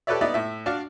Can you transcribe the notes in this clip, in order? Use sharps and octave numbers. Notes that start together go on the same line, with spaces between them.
G4 A4 B4 C#5 D5 E5
B3 D#4 D5 E5
A2 E5
D4 F#4 D5 F5